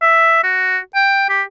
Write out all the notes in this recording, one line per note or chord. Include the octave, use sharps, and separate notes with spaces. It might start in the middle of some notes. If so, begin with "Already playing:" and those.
E5
F#4
G5
G4